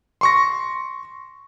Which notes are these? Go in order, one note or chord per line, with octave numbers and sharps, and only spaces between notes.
C6 C#6 A#6